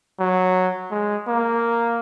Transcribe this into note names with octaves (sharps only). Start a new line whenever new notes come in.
F#3
G#3
A#3